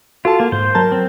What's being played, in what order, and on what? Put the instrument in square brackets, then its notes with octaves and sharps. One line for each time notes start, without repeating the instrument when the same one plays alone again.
[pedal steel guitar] F4 [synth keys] F#4 A4 A5
[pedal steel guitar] A#3
[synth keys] G#2 [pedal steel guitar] C5
[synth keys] F#3 A#4 A5
[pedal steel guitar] C4